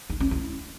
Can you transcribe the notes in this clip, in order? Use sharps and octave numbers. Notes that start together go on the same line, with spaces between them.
D#4
C#4
E4